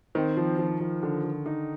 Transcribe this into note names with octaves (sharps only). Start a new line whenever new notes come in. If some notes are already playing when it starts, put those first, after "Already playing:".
D#3 C4
F3
F3
F3
D3
D3
D#4